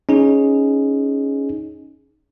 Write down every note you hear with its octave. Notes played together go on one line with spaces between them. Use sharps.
C#4 D#4 G#4